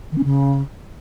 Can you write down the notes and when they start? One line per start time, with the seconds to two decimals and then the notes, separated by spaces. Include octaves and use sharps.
0.12 D#3
0.18 C#4
0.24 C#3